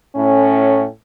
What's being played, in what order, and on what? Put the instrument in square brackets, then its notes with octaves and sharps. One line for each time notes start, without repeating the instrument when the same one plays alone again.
[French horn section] A2 C#4